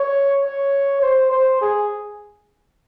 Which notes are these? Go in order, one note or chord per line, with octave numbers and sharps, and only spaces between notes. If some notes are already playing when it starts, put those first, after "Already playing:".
Already playing: C#5
C#5
C5
C5
G#4